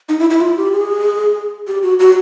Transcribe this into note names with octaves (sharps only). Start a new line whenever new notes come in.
D#4
E4
E4
F4
G4
G#4
G4
F#4
F#4